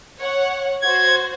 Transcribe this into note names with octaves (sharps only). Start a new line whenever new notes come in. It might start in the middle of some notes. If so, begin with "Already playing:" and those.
C#5 F#5
F#4 C5 G#6